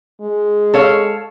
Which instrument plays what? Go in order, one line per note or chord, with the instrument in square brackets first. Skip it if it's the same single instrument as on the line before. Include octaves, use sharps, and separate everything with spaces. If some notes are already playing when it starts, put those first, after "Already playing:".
[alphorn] G#3
[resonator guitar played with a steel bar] A4 C#5 F5